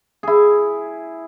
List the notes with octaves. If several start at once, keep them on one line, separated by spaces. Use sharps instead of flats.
E4 G#4